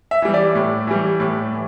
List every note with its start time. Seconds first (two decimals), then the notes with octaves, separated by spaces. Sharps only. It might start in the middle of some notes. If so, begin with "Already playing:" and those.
0.11 E5
0.22 E3 G3
0.34 D5
0.55 A2
0.87 E3 G3
1.20 A2
1.53 E3